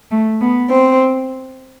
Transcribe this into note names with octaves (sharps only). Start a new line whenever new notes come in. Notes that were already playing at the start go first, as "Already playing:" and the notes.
A3
B3
C4